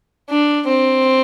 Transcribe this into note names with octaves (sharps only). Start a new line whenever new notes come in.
D4
C4